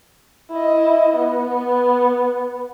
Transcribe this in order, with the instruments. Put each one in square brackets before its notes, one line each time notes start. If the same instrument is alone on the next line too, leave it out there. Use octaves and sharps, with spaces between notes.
[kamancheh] E4 D#5
B3